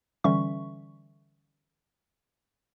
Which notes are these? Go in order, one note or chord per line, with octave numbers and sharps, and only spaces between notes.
D3 E3 G3 C#4 E5 C#6